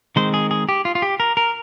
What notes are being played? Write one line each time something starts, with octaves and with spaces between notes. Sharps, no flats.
D#3 G#3 C4 C5
G#4
G#4
G4
F4
F4
G4
A#4
A#4